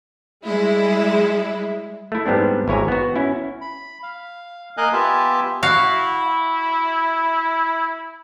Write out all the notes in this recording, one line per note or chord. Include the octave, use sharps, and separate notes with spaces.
G3 G#3 E4
A3 E4
G#2 G3 B3 C4 D4
G#1 E4 C#5 G#5 A#5
B3 F#4
C#4 E4
B5
F5
A#3 A#4 D#5 F5 G#5 F#6
B3 F4 G4 E5 G#5 A5
E4 F#4 F5